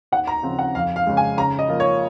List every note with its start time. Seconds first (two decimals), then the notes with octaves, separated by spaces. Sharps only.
0.12 D#2 F#5
0.27 A#5
0.43 C#3 F3 C4
0.59 F#5
0.75 F2 F5
0.96 F5
1.06 C#3 G#3
1.17 G#5
1.37 C#3 A#5
1.59 D#5
1.69 F3 A#3 F4
1.80 C#5